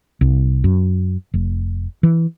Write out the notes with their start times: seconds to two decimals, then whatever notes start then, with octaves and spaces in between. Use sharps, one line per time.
0.21 C2
0.64 F#2
1.34 F1
2.03 E3